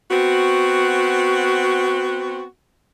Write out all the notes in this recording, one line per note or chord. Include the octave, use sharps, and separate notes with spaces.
B3 C4 F#4